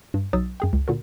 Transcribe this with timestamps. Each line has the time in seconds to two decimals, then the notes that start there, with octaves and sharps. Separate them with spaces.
0.14 G2
0.33 B1 F#3 D#4 D#6 E6 A6
0.60 F#2 G#4 G5
0.73 C#2
0.88 A#2 D3 F#4 A#4